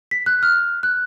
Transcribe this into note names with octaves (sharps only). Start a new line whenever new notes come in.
B6
F#6
F6
F#6